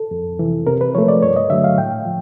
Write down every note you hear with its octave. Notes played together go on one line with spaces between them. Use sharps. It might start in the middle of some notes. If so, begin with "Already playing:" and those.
Already playing: A4
F2
C3 E3
C3 A#4
B4
F3 A3 C#5
D5
G2 C#5
D#5
D3 F#3 A3 E5
F5
A2 G5
F3